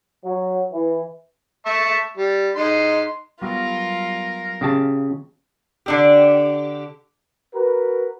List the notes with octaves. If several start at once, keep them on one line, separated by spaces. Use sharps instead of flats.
F#3
E3
E5 A5 C#6
G3
D#4 C6
F#3 G3 B3 F4 A#4
C#3 G4 A5
D3 D4 G4
F#4 A#4 B4